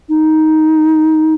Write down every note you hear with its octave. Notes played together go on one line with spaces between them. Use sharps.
D#4